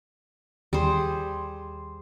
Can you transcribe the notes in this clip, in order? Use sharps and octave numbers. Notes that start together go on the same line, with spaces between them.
D#2 G3 G#4 C5 C6